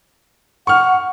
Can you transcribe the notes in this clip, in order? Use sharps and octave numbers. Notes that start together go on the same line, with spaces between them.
F#5 C#6 F6